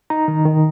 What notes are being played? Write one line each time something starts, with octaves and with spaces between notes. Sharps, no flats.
D#4 A#5
D#3
D#3